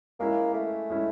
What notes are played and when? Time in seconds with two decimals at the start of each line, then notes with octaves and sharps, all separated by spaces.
0.20 G#3 A#3 C#4 E4
0.54 A3
0.90 G#3 C#4 E4